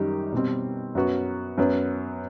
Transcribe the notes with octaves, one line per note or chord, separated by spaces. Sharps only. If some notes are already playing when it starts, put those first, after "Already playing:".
Already playing: F#2 D#3 G3 D#4 G4
B2 G3 C4
F#2 F#3 B3 F#4
F#2 F#3 B3